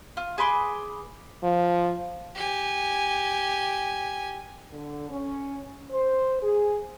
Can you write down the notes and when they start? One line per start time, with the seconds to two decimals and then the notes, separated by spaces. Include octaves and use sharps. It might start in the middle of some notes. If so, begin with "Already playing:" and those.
0.17 F4
0.38 G#4 B4 C6 D6
1.43 F3
2.35 G4 G#5
4.73 D3
5.10 C#4
5.92 C5
6.43 G#4